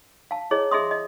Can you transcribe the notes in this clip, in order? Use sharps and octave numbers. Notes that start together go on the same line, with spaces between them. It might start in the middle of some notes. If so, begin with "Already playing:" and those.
F5 A5
E4 G#4 C#5 D#5
G#4 D#5 E5 C6 D#6
D#5